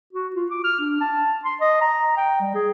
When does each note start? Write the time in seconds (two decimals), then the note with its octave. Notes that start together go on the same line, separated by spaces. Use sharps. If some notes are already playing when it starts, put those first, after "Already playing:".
0.13 F#4
0.35 F4
0.51 D6
0.64 F6
0.80 D4
1.01 A5
1.45 C6
1.61 D#5
1.81 A#5
2.17 G5
2.41 G3
2.55 G#4